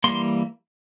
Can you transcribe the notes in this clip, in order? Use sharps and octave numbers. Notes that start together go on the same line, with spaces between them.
E3 G3 A#3 C6